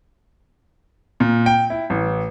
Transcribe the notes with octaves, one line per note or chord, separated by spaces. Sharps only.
A#2
G5
E4
A1